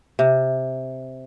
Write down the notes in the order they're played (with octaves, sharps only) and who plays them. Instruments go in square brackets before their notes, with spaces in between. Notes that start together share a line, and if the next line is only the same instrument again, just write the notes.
[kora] C3